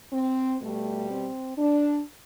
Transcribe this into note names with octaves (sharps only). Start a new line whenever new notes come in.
C4
B2 G3 A3
C4
D4